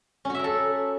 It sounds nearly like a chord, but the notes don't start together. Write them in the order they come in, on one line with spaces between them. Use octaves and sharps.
C#4 F#4 E5 A#4 A4